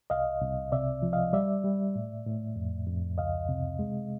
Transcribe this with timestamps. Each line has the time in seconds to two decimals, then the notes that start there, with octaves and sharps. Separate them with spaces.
0.10 C2 D#5 F5
0.41 C2
0.72 C3 D5 E5
1.02 F3
1.13 D#5 F5
1.33 G3 D5 E5
1.64 G3
1.95 A2
2.26 A2
2.56 F2
2.87 F2
3.17 C#2 D#5 F5
3.49 C3
3.79 G#3